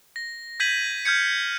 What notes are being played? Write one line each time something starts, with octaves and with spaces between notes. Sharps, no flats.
A#6
G6 G#6 B6 D#7 F#7
F6 G6 G#6 C#7